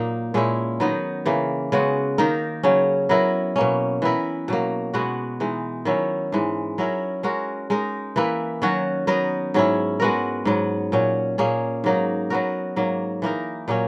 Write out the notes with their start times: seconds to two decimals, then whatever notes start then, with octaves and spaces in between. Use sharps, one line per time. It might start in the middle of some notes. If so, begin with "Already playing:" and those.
Already playing: A#2 F#3 A#3 D#4
0.34 A#2 G#3 C#4 E4
0.80 D#3 F#3 B3 D#4
1.25 C#3 E3 A#3
1.72 C#3 G#3 B3 F#4
2.18 D#3 A#3 D#4 A#4
2.63 C#3 F#3 C#4
3.09 F#3 B3 E4 A#4
3.56 B2 A#3 C#4
4.02 E3 B3 E4 A#4
4.48 B2 F#3 A#3
4.94 B2 G#3 B3 F#4
5.40 E3 G#3 D#4
5.85 D#3 F#3 C#4 E4
6.32 G#2 E3 G#3
6.78 F#3 C#4 E4 A#4
7.23 G#3 C#4 F#4 A#4
7.70 G#3 D#4 A#4
8.16 E3 A#3 E4 B4
8.62 D#3 F#3 C#4 F#4
9.07 F#3 B3 D#4 A#4
9.54 G#2 F#3 C#4 E4
10.00 G#3 B3 F#4 A#4
10.45 G#2 F#3 B3
10.92 A#2 F#3 C#4
11.38 A#2 A#3 C#4 G#4
11.84 G#2 F#3 A#3 D#4
12.30 F#3 B3 F#4 A#4
12.76 G#2 F#3 A#3
13.22 E3 A#3 D#4 A#4
13.68 A#2 F#3 A#3 C#4